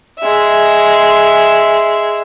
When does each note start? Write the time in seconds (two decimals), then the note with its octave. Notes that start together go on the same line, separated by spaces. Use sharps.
0.19 G#3 E5